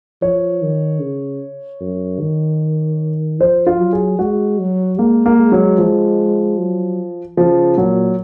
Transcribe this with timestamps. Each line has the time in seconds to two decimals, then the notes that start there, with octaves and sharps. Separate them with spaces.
0.22 F3 C#5
0.62 D#3
1.01 C#3
1.81 F#2
2.21 D#3
3.40 F3 C5
3.67 F4
3.80 F#3
3.93 G#4
4.19 G#3 F#4
4.59 F#3
4.98 G#3 A#3
5.26 A#3
5.39 G#3
5.52 F#3
5.78 F3
6.58 F#3
7.37 C#3 F3
7.77 A#2 F#3